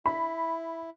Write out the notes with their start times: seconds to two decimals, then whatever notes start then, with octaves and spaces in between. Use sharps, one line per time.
0.06 E4 B5